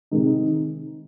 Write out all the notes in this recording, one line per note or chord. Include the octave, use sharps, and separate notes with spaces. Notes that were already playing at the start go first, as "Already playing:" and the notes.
C3 D#3 G#3 D#4